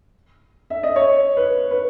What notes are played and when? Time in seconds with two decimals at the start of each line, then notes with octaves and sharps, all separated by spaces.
0.70 E5
0.83 D#5
0.96 C#5
1.37 B4
1.71 B4